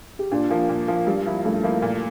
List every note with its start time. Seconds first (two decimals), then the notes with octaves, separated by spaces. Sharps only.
0.19 G4
0.31 A#2 D4 F4
0.51 F3 A#3
0.69 A#2
0.88 F3 A#3
1.07 G2 G3
1.26 F3 A#3 E4
1.45 G2 A3
1.63 F3 A#3 E4
1.82 A#2